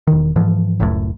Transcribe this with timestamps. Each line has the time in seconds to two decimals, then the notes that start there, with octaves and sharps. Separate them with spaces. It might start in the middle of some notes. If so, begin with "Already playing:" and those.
0.07 E1 D#3
0.36 G#2 E3 F3
0.80 F#1 C#2 F#2 A2